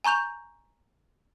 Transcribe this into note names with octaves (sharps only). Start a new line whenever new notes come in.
G#5 A#5 C#6 G6 F7